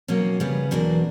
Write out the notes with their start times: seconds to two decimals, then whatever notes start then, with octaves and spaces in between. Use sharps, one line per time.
0.08 B2 F#3 A#3 C#4
0.40 C#3 G3 B3
0.71 E2 B2 F#3 A#3 D4